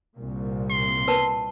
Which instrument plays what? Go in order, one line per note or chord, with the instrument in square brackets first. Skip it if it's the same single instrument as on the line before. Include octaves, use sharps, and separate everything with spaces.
[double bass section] C2 A#2
[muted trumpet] C6
[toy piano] A#4 B4 A5